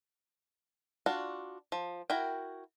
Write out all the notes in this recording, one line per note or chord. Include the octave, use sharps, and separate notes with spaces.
D4 F4 F#4
F3
E4 F#4 A#4 G5